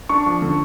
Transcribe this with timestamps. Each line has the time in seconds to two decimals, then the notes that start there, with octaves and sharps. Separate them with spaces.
0.09 D4 C#6
0.26 F3
0.42 D3